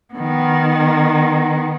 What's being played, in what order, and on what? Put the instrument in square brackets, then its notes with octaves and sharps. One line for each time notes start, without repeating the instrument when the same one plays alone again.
[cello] D#3 B3